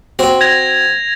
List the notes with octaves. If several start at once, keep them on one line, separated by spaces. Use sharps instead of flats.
C4 F#4
G#6 A#6 F7